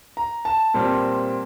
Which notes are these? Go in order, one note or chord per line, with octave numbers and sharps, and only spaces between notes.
A#5
A5
A#2 G3 C4